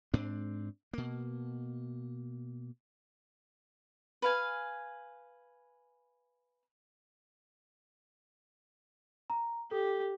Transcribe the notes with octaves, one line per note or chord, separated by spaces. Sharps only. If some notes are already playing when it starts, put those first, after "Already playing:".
G#2 C4 D4
B2 A#3
B4 F5 G#5
A#5
G4 A4